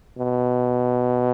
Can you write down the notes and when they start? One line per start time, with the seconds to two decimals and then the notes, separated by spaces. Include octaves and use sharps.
0.18 B2